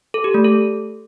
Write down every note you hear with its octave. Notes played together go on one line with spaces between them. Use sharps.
A4
G4
A3
A4